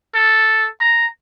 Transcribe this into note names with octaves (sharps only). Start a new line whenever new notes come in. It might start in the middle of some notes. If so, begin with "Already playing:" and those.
A4
A#5